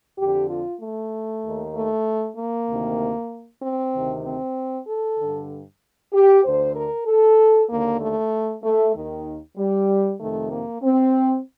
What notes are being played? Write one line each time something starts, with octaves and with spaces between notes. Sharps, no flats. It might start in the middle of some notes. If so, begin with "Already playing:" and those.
F2 D3 G4
F4
A3
D#2 D#3
A3
A#3
D2 C3 D#3
C4
D2 C3 D#3
C4
A4
G2 D3
G4
D2 D3 C5
A#4
A4
D#2 D3 A#3
A3
A3
D#2 D#3
G3
F2 C3 D#3 A3
A#3
C4